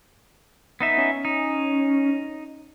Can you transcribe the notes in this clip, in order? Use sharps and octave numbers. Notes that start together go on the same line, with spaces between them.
B3 D#4 E5
C#4
D#4